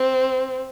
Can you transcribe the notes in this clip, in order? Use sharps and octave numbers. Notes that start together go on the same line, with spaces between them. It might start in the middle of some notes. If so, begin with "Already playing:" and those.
Already playing: C4